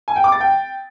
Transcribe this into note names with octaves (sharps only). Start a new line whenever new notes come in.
G#5
G5
D6
A6
G5